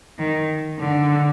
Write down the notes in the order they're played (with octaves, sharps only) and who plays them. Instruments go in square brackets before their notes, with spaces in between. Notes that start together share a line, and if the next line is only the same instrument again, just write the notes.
[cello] D#3
D3